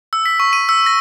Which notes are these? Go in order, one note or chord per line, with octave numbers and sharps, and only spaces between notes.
E6
B6
C#6
D#7
E6
A#6